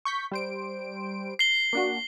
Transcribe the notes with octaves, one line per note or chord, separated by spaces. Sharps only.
C#6 G6 B6
G3 C5 D7
C7 G7
A#3 D4 F#4